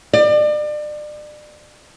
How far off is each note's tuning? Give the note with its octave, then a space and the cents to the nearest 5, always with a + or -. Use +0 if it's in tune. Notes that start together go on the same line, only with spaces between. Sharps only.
D5 +35